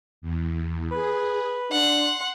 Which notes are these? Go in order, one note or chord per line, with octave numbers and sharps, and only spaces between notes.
E2
G#4 B4
D4 F#5 C6